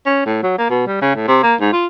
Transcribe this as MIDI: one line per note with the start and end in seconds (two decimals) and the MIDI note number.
0.06 0.21 61
0.26 0.38 45
0.43 0.55 54
0.58 0.69 58
0.69 0.86 47
0.87 1.00 55
1.02 1.13 49
1.15 1.26 45
1.28 1.38 48
1.43 1.55 58
1.60 1.72 44
1.72 1.87 65